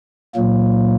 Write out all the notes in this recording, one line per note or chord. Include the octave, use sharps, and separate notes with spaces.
A#2 F#3 A#3